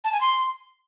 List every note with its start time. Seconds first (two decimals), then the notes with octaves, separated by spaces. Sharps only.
0.04 A5
0.13 G#5
0.21 C6